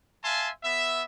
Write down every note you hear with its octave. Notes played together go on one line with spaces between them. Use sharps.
E5 F5 G#5 A5 C6
B3 E5